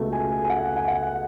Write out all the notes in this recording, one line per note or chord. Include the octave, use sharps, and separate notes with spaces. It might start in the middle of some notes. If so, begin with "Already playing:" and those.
Already playing: C#2 B2 A3
G#5
G#5
F#5
G#5
F#5